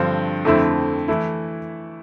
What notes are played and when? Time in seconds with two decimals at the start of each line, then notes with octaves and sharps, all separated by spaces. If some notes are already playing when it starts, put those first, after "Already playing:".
Already playing: G2 D3 F3 C4
0.45 F2 D3 A3 C4 E4
1.08 E3 A3 E4